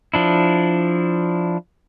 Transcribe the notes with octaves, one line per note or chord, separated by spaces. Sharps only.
F3 D4 E4